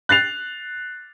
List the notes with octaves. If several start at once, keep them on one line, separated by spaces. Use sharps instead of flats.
F#6 A6 C7 F7